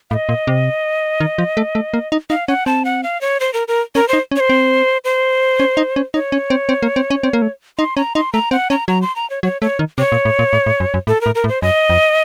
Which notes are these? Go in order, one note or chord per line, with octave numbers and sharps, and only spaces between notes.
A2 F5
D#5
A#2
C3
D#3
F3
A3
A3
A#3
D#4
D#4 F5
C#4 F#5
C4 A5
F#5
F5
C#5
C5
A#4
A#4
C#4 A#4
D#4 C5
C#4
C#5
C5
C4
C5
C#4
D#4
C#4
D#4 C#5
C#4
C4
C4
A#3
C4
C#4
C4
A#3
A3
D#4 C6
C#4 A#5
D#4 C6
A3 A#5
C4 F#5
C#4 A#5
F#3 A#5
C6
A#5
C#5
F#3 C#5
A3 C#5
D#3
C3 C#5
A#2
A2
A#2
A2
A2
F#2
F#2
A2 A4
A2 A#4
A#4
A2
C5
F#2 D#5
F2